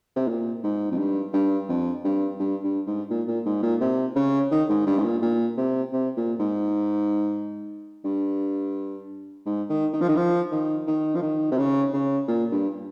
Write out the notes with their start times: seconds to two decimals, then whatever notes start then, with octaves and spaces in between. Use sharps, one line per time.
0.16 C3
0.28 A#2
0.63 G#2
0.92 F2
0.98 G2
1.33 G2
1.69 F2
2.04 G2
2.40 G2
2.63 G2
2.86 G#2
3.10 A#2
3.28 A#2
3.46 G#2
3.63 A#2
3.81 C3
4.16 C#3
4.51 D#3
4.69 G#2
4.87 G2
4.99 G#2
5.04 A#2
5.22 A#2
5.57 C3
5.93 C3
6.17 A#2
6.40 G#2
8.05 G2
9.46 G#2
9.69 D#3
9.93 D#3
10.01 F3
10.09 D#3
10.16 F3
10.52 D#3
10.87 D#3
11.15 F3
11.22 D#3
11.52 C3
11.58 C#3
11.93 C#3
12.28 A#2
12.52 G2